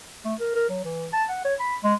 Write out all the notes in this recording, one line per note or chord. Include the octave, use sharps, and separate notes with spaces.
A3
A#4
A#4
F#3
E3
A5
F#5
C#5
B5
G#3